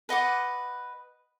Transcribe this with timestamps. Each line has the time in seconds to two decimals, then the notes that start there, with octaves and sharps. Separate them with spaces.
0.09 B4 D#5 F#5 D6